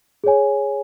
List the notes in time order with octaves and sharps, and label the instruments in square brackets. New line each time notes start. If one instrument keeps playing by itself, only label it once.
[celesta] G#4 C#5 G#5